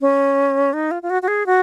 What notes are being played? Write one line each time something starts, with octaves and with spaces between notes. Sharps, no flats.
C#4
D#4
F4
F4
F#4
F#4
G#4
F#4